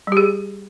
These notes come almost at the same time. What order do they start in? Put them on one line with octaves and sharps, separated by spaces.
G3 G4 G#4